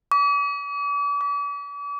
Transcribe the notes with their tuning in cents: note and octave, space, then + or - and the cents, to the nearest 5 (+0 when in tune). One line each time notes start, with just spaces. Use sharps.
D6 -40
D6 -40